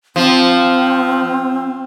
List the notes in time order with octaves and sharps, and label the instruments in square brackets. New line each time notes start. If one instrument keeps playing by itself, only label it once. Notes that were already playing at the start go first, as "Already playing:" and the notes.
[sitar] F3 [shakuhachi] C4